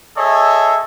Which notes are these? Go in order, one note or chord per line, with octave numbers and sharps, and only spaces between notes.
G#4 A4 C#5 D#5 E5